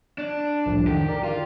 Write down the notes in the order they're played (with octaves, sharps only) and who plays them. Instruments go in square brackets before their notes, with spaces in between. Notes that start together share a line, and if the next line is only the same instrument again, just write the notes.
[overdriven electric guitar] D4
[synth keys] C2 F2 A2
[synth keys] D3 D#3 [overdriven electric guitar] G4
[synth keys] A#4 D5
[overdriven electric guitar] F4